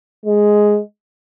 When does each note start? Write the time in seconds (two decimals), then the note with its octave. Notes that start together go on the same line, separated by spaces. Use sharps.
0.26 G#3